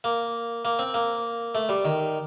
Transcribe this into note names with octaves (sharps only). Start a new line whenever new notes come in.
A#3
A#3
C4
A#3
A3
G3
D#3